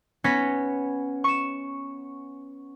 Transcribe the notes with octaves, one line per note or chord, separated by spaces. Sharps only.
B3 C#4 C#5 A#6 B6
C#6 E7